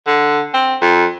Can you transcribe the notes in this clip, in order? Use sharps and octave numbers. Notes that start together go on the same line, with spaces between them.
D3
C4
F2